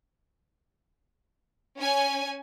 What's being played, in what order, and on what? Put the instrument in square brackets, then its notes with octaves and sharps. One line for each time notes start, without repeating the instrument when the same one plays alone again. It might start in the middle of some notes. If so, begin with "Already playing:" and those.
[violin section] C#4 G#5